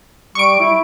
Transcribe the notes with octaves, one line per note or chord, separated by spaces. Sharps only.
G3 C#6 D7
E4